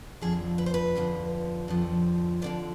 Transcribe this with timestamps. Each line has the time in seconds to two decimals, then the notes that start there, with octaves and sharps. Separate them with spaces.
0.21 F2 D3 F3 G#4
0.58 B4
0.66 C5
0.74 B4
0.96 F2 D3 F3
1.68 F2 D3 F3
2.42 F2 D3 F3 D5